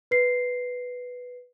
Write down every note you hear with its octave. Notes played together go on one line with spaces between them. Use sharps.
B4 C7